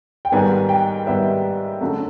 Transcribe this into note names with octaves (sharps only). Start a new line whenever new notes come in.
G5
G#2 D#3 G3 B3 G#5
G5
G#2 D#3 G3 B3 E5
F#2 D3 F#3 A3